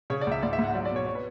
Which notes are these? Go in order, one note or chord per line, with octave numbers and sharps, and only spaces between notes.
C#3 C#5
D5
C#2 E5
G#2 D5
E5
G#2
F#5
F#3 D5
D5
B2
C#5
C#5
B4